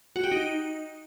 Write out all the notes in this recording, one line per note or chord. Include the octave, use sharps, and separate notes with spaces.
F#4
G4
D#4